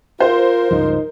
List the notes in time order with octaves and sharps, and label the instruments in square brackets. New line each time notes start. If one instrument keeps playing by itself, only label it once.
[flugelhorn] F4 [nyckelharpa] A#4 [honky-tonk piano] C5
[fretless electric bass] C#2 G2 F3 [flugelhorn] D#4